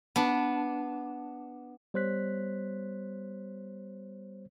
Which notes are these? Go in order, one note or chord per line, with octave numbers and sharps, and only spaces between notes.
B3 D4
G3 B3 C5 C#5 F#6 B6